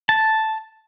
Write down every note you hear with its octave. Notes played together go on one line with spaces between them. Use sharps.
A5